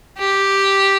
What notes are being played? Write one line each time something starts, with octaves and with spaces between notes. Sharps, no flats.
G4